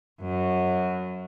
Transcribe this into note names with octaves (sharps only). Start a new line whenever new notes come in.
F#2